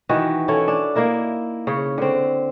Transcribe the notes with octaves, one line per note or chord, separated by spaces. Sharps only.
D#3 E3 F#4 B4
C#4 E4 A4 C#5
D4
A#3 D#4 E4 A#4
C#3 C#5
D3 C4